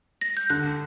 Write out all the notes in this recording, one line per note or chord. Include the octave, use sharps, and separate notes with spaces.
A#6
G6
D3 F#6